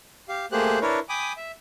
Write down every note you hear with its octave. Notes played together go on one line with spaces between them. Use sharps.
G4 F5
A3 A#3 G4 G#4 C5 F#6
D4 E4 A#4 B4 C#5
G5 G#5 B5 D6 D#6
E5